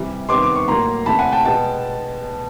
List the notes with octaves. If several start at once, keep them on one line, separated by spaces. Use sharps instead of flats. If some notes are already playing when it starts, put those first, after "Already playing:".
Already playing: C3 E3 G3
C3 D#3 G3 B3 C6 D6
D6
C#6
A2 F#3 A#3 A#5 C6
C3 E3 A3 A5 B5
F#5 G#5
G5 A5
B2 G#3 B3 G5 A5